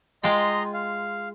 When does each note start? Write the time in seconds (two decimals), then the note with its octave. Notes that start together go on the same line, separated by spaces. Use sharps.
0.23 G#3 F4 D#5 G5 A#5 C6
0.74 F5